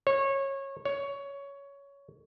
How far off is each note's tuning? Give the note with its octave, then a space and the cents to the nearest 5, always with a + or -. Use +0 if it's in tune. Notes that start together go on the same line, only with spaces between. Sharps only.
C#5 -20
C#5 +15